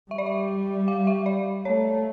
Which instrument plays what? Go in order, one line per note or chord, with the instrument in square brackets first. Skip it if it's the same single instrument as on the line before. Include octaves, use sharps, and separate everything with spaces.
[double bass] G3 [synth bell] E5
[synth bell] D5
E5
F5
E5
D5
[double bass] A3 [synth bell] C#5